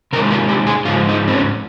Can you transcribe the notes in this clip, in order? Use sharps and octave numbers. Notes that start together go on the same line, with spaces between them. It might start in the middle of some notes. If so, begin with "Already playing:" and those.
C3 D#3 G#3 A#4
F4
G4
G#4
G#2 F3 G#3 F4
D#4
C4
C#4